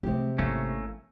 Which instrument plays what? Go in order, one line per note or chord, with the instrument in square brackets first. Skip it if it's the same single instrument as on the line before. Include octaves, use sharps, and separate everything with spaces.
[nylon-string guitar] C3 G#3 G4 [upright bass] E3 A3
[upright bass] G#1 E3 [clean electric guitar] A3 A#3 C#4